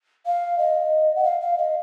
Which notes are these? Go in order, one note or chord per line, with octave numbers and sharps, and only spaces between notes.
F5
D#5
F#5
F5
F5
D#5